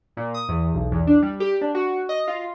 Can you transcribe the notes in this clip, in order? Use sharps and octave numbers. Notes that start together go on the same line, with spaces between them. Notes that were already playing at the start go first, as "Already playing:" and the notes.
A#2
D#6
E2
B1
E2
D4
G3
G4
D4
F#4
D#5
F4